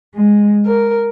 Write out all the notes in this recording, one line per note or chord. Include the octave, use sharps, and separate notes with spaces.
G#3
A#4